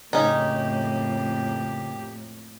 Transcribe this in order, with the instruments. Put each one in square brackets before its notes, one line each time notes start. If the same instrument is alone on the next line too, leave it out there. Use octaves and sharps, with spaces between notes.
[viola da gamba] F2 A2 A#3 [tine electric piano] C#3 [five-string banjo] C#4 D#4 [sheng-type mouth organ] G4